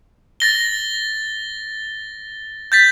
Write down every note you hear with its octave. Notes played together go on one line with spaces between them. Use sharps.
A6 A#6 G7
G6 A6 B6